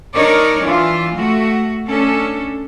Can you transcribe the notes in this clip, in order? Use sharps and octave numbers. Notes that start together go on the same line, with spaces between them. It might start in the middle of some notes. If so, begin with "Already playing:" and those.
D4 D#4 A#4 C#5 D5
E3 D4 F4
A3 F#4
A3 C#4 D4 A4